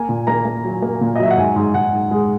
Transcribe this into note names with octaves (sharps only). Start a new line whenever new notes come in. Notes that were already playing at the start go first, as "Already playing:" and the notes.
Already playing: A#3 G#5
A#2
A#3 A#5
A#3
F#3
A#3
A#2
D#5
F#3 E5
F#5
G#2 G#5
G#2
G#2 F#5
G#2
G#3